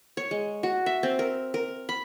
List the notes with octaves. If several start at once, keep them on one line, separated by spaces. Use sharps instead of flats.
C#5
G#3
F#4
E5
C4
A#4
A#4
B5